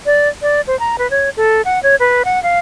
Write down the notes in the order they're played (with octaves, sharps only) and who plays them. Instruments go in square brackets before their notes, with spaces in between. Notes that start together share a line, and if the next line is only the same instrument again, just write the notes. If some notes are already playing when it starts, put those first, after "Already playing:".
[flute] D5
D5
C5
A#5
B4
C#5
A4
F#5
C#5
B4
F#5
F5